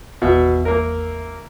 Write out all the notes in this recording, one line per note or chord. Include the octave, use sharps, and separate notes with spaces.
G#1 E2 B2 E5
A#3 A#4